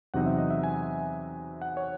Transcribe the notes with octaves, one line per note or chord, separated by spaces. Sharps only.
E2 C3 F#3 C4 D#4 F#5
E5
D#5
E5
G#5
F#5
C#5